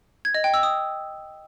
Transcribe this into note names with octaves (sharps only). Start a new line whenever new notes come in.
G#6
D#5
G5
E6
D#6